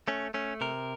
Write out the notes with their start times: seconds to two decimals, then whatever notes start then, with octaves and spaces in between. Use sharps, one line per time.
0.08 A3 C#4
0.34 A3 C#4
0.61 C3 A#4